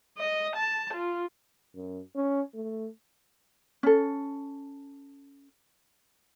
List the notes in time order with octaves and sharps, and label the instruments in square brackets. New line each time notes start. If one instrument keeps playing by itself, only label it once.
[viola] D#5
A5
F4
[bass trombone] F#2
C#4
A3
[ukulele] C#4 A4